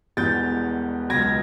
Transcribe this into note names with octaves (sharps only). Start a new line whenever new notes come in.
E1 E2 B2 G3 G6 A6
C#2 B2 F#3 G#6 A#6